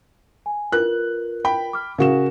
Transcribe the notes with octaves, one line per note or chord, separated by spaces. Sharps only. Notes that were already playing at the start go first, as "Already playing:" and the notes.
G#5
F4 A#4 B4 F#6
G5 B5
D6 F6
C#3 F#4 A#4 E7